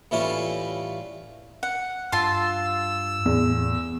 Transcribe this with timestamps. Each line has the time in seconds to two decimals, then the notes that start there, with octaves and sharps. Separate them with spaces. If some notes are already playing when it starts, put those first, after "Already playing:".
0.11 A2 E3 G3 C#4 F4
1.63 F#5
2.12 G2 F4 A5 C6 E6
3.26 E2 A2